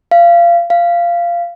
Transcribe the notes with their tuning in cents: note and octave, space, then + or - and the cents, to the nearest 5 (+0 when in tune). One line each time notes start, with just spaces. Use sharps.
F5 -25
F5 -15